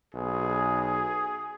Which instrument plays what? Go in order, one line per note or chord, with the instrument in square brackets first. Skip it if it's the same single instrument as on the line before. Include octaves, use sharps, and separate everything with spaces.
[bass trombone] B1 [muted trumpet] G#4